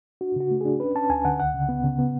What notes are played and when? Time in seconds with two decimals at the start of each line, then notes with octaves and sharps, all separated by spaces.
0.21 D4 F#4
0.36 C#3 F#4
0.51 A3
0.61 D4 G#4
0.80 C#4 B4
0.95 C#4 A5
1.09 D2 G#5
1.25 D3 F#5
1.39 C#2 F#5
1.54 C#3
1.69 B3
1.84 C#3
1.99 B3